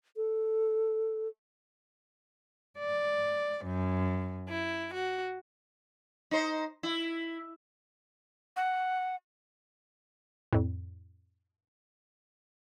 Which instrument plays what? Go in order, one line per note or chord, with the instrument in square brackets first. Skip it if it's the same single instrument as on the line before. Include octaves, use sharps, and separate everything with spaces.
[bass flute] A4
[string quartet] D5
F#2
E4
F#4
[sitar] D#4 C5
E4
[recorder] F#5
[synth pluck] F2 A2